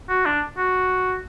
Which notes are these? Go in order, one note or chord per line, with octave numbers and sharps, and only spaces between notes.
F#4
D4
F#4